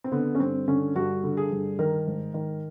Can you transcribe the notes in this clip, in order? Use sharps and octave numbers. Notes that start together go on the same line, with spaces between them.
C4
D3 B3
C#4
G2 C4
D3 C#4
G2 F#4
D3
G#4
G2
D#3 A#4
G#2
D#3